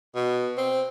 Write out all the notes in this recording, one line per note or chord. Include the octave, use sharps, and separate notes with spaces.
B2
C4